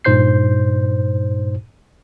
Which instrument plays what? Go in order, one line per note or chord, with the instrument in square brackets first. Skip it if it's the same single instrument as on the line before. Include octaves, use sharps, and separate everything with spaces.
[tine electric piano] G2 A#2 D#4 C5 G6 C7